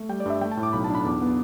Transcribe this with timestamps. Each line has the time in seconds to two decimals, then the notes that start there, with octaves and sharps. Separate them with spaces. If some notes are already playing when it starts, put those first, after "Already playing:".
Already playing: A3
0.09 G3 G5
0.20 D5
0.26 G2 E5
0.41 A3 G5
0.52 A5
0.57 A2
0.63 D6
0.73 B1 B5
0.84 A5
0.90 D4 B5
1.05 E2 D6
1.22 B3